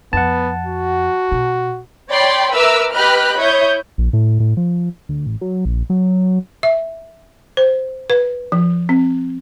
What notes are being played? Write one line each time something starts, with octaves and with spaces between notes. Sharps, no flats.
F2 B3 F#5 A5
F#4
B2
C#5 D5 G5 B5 C6
A#4 B4 E5 D6 E6 F6
G4 B4 D#5 B5 F6 F#6
E4 C#5 D#6 G6
A#1
A2
A2
F3
D2
A1
F#3
A#1
F#3
E5
C5
B4
F3
C4